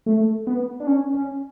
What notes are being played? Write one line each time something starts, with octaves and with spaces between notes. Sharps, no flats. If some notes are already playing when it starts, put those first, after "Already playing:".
A3
B3
D4
C#4
C#4